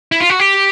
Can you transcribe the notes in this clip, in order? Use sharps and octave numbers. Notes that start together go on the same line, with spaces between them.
E4
F4
F#4
G4